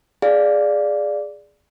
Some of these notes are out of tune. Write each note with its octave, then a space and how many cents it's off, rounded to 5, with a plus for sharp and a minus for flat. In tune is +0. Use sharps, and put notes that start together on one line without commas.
G#4 +0 D5 +0 F5 +0